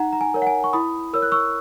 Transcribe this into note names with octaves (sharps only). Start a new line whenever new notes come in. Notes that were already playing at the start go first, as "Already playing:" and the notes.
Already playing: D#4 F#5 A#5
A#5
G#5
A#4 C#5
F#5
G#5
C#6
E4 B5 D#6
A#4 C#5 E6
F#6
C#6 E6